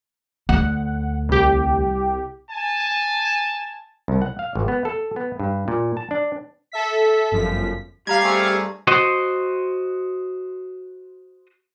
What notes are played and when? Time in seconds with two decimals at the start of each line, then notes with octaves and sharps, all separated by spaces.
0.49 D2 F#5
1.29 C2 G4
2.50 G#5 A5
4.08 C2
4.22 F#5
4.39 F5
4.55 G#1
4.68 B3
4.85 A4
5.16 B3
5.40 G2
5.68 A#2
5.97 A5
6.11 D4
6.72 A4 E5 B6
7.32 G1 F#2 F3 B6
8.07 G2 G4 F5 A#5 G#6
8.23 A3 C4 G#4
8.87 F#4 C5 D#5